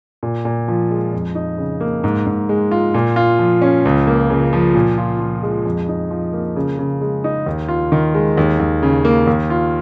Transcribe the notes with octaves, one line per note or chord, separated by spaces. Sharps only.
A#2
A#2
F3
G#3
F2
D#4
C#3
A#3
G#2
G#2
G#3
F4
A#2
F4
F3
C#4
C#2
A#3
C#3
F3
A#2
F4
F3
G#3
F2
D#4
F3
A#3
C#3
C#3
G#3
D#4
D#2
F4
D#3
G#3
D#2
D#2
C#3
A#3
D#2
F4